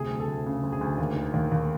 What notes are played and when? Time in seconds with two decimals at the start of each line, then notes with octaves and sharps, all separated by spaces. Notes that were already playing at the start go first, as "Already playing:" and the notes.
Already playing: D2 C3 G#4
0.11 D2
0.20 A4
0.28 D2
0.46 C#3
0.63 D2
0.72 G#4
0.81 D2
0.98 D#2
1.16 D#3
1.34 D#2
1.52 D#2